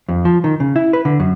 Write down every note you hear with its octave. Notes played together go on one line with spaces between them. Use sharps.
F2
F3
D#3
C#3
E4
B4
D3
F#2